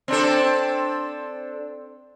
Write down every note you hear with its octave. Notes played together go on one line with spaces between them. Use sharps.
C4 D4 A4